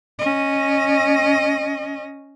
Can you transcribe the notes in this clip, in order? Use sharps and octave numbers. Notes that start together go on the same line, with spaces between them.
C#4 D#5